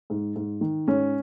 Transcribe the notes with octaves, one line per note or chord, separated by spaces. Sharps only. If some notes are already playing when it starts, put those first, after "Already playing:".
G#2
G#2
D#3
G#2 C#4